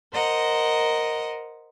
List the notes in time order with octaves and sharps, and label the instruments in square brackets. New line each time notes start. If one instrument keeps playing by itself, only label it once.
[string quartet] A#4 C5 D#5 F#5